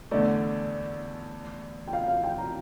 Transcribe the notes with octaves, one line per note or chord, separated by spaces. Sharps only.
E2 D3 A3 D5
G5
F5
F5
G5
A#5